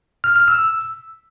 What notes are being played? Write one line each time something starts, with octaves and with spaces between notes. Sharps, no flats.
F6
F6
E6